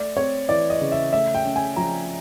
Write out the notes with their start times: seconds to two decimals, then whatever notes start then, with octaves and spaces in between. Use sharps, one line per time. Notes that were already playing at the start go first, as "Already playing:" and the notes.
Already playing: A3 D5
0.16 C4 C#5
0.49 E3 D5
0.70 D#5
0.81 C#3
0.92 E5
1.13 A3 E5
1.34 G5
1.45 C#4
1.56 G#5
1.76 F3 A#5